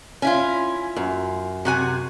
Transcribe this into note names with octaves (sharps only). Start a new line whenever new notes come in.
C#4 E4 F4 G#5
F#2
C3 F#4 G#5